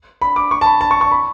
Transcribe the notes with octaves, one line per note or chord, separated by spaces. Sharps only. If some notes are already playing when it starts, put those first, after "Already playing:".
B5
D6
C#6
A5
B5
A5
C#6
C#6
B5